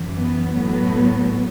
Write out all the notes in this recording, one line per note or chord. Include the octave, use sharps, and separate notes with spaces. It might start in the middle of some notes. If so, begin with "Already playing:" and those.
Already playing: F#2 E3
B3
A2 F#3 B3